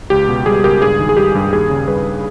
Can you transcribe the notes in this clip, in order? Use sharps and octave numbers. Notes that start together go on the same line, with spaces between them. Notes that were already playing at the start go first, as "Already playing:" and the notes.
C#2 G4
B2
G3 G#4
C#2 G4 A#4
G2 G#4
D#3
G#4
G3 G4
G2
D#2 G#4
C#3
G3 G#4 B4